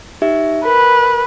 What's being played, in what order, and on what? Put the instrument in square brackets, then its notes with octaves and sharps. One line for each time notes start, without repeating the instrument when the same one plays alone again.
[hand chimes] D#4 G4 E5
[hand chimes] A#4 [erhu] B4